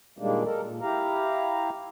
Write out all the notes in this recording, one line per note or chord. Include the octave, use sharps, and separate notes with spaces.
A#2 D#3 G3 G#3 A#3 D4
A4 A#4
A#2
E4 G4 F5 A#5